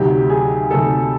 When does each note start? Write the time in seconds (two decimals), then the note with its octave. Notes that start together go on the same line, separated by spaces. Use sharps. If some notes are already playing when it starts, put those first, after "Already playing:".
Already playing: D2 C3 D#3 F#3 G4
0.29 G#4
0.71 D2 C3 D#3 F#3 A4